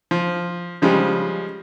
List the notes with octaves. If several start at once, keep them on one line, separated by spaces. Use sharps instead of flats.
F3
C#3 F3 G3 G#3